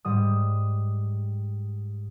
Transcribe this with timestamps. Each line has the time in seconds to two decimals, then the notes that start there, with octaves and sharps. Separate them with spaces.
0.05 G#2 G3 D#6